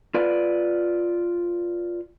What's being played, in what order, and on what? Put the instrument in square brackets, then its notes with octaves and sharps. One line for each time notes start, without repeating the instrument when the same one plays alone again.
[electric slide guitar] F4 B4 D5